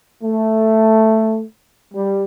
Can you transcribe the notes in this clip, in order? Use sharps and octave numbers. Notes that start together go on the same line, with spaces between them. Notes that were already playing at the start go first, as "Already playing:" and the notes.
A3
G3